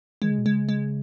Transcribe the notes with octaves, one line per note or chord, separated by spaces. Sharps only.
D#3 G#3
C#3
B2
C#3 G#3
G#3